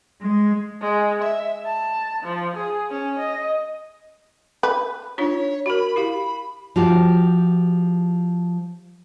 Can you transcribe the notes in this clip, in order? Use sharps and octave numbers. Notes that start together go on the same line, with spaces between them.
G#3
G#3
E5
A5
F3
G#4
C#4
D#5
B4
D4 D#4 F4 C#5
F#4 A#4 B5
E4 G4 F5 B5
F3 F#4 G4